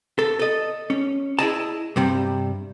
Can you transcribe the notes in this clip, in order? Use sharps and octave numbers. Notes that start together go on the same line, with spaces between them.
A4
A4 D#5
C#4
E4 G#4 D#5 A5
G2 C3 G3